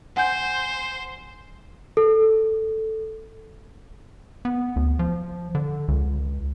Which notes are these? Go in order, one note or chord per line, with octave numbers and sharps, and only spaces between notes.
C5 F#5 G#5 G6
A4
B3
D2
F3
D3
C#2